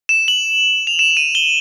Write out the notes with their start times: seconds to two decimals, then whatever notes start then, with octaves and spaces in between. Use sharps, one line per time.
0.09 E7
0.28 F#7
0.87 F7
0.99 E7
1.17 D#7
1.35 G7